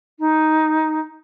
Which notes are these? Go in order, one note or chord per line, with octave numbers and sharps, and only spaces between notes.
D#4